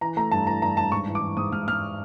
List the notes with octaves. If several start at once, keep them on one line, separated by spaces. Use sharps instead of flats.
E3 A#5
A3 A#5
G2 A5
E3 A#5
G2 A#5
G2 A5
G#2 C#6
E3
D6
E3
G#2 D#6
G#2 F6
G#2 F6